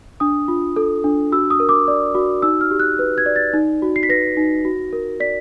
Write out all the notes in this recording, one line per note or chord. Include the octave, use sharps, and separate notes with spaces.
D4 D#6
F4
A4
D4
F#4 E6
D#6
A#4
D6
D5
F#4
D#4 E6
F6
G4
F#6
B4
G#6
D5
A6
D#4
F#4
C7
B6
B4 A#6
D#4
F#4
A#4
D5 B6